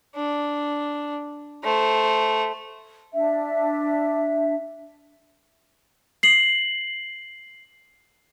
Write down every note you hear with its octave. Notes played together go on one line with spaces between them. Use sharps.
D4
A3 C5
D4 E5
C7 F#7